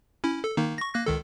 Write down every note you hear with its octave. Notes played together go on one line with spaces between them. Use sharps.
C#4 E4
A4
D#3 A#3 D#4
C#6 A#6
A#3 F#6 A#6
C#2 D#3 A4